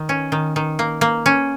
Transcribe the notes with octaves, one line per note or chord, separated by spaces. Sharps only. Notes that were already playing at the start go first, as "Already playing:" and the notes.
Already playing: D#3
C#4
D#3
D#3
A#3
A#3
C#4